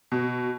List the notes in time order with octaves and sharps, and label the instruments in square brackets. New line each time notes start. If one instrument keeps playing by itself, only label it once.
[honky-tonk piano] B2